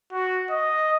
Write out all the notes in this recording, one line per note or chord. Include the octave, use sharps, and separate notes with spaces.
F#4
D#5